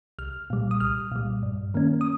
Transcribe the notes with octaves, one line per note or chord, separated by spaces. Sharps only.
C2 F6
A#2 G3
D#6
C2 F6
A#2 G3
G2
D#3 A#3 C#4
D#6